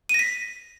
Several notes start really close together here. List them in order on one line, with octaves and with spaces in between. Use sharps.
D#7 A#6 B6